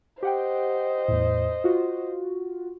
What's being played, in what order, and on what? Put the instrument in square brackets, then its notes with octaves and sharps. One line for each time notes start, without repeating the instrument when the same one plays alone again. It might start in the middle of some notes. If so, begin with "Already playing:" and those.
[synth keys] G4 F#5 G5 [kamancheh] C5 D#5
[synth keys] E2 A2
F4 F#4